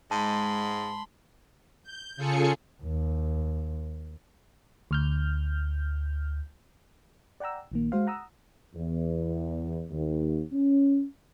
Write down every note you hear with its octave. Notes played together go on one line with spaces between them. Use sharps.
G#2 G#3 A5 B5 C6
G6
C#3 F4 G#4 A4 G#5 C#7
D#2
D2 F6 G6
D5 F#5 G5 A#5 E6
A#1 D#3 A#3
G#3 F#4 C5 F5
F#5 A#5 D#6 E6
E2
D#2
C#4